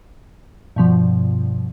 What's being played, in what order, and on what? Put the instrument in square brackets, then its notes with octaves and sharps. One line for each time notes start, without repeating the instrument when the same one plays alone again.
[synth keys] G2 B2 F3